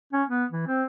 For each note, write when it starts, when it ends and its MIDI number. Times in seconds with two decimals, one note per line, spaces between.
0.13 0.23 61
0.29 0.45 59
0.52 0.65 52
0.67 0.84 60